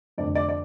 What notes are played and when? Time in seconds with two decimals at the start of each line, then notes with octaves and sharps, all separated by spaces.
0.18 F1 F2 D3 D5
0.35 D5
0.49 D5